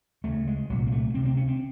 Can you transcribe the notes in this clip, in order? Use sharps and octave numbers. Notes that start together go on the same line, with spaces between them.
D2 C#3 A3
G#3
C2 A#2 F#3
A#3
A3
D2 C3 C4
C4
C#4
C4